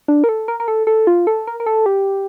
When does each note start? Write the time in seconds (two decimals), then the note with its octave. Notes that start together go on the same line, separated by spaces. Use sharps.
0.08 D4
0.24 A#4
0.29 A4
0.48 A#4
0.60 A#4
0.68 A4
0.87 A4
1.07 F4
1.27 A4
1.47 A#4
1.60 A#4
1.66 A4
1.86 G4